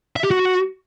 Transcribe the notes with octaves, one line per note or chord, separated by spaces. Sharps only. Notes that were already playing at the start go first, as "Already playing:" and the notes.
E5
G4
F#4